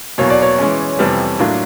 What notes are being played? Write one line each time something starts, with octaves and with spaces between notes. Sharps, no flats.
E2 B2 F#3 A#3 C#5
D5
C#5
E3 G#3 C#4
F2 C3 E3 G3 B3
A2 F#3 A#3 D4 F4